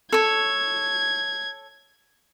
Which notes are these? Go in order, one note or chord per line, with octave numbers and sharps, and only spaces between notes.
A4 C#5 G#6